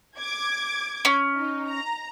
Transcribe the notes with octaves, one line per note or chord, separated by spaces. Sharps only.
D6 G#6
C#4
D#4
A#5